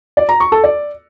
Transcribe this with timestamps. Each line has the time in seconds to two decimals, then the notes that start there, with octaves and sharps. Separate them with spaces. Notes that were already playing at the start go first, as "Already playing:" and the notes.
0.17 D5
0.29 A#5
0.40 C#6
0.52 A4
0.64 D5